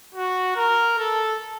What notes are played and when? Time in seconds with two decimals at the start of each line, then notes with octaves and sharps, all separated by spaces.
0.15 F#4
0.56 A#4
0.99 A4